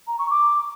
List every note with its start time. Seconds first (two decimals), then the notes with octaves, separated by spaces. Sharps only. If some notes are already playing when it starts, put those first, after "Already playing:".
0.07 A#5
0.19 C#6
0.30 D6